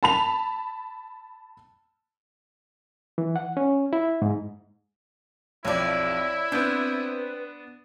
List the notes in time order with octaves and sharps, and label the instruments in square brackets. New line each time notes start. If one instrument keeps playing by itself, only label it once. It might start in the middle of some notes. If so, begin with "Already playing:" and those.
[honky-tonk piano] A5 B5 F7
[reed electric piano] E3
F#5
C#4
E4
G#2
[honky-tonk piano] B1 F2 [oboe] E4 [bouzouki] C#5 D5
[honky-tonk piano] B3 D4 [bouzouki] C4 [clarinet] B4